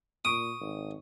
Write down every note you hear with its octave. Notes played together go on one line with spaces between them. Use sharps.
A#2 C#6 D#6 D7
G#1